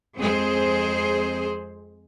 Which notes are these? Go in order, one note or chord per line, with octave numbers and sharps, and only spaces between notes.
F2 G#3 C4 G#4 C5